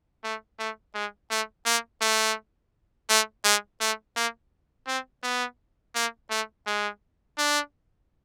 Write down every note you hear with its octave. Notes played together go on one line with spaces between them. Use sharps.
A3
A3
G#3
A3
A#3
A3
A3
G#3
A3
A#3
C4
B3
A#3
A3
G#3
D4